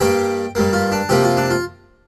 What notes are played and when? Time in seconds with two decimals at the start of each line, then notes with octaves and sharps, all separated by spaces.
0.01 G2 G3 A#3 G5
0.55 G2 G3 A#3
0.73 F4
0.92 D4
1.09 C3 F3 A#3 G4
1.24 F4
1.37 D4
1.50 F4